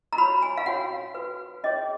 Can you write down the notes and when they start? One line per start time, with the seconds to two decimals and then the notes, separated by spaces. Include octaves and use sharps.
0.13 A#5
0.18 F#4 C#5 B5
0.42 G#5
0.57 F5
0.66 C#4 F#4 C#5 F#5
1.15 F#4 B4
1.64 C#4 G#4 C#5 D#5